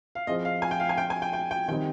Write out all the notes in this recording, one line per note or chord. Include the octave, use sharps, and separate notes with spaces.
F5
F3 C4 F4 G#4 C5 D#5
F5
G#5
G5
F5
G#5
G5
G#5
G5
G5
G5
D#3 G3 C4 D#4 G5